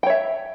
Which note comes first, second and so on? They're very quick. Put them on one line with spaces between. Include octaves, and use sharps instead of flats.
G5 C#5 E5